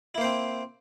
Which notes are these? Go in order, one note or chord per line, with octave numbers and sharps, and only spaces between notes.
A#3 C4 E4 C5